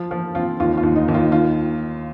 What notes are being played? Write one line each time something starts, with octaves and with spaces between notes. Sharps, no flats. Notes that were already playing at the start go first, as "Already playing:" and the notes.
Already playing: F3 F4
F3 F4
C4 F4
D#2 F4
F4
D#2
D#4
D#2
F4
D#3 F4